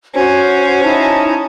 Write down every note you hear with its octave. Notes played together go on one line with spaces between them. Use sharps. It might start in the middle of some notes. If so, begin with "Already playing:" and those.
C#4 F#4 C5
D#4 E4 A5